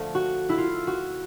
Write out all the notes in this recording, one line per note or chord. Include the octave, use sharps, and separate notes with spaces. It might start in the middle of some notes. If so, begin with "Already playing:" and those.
Already playing: D3 F3 A3
F#4
E4
F4
F#4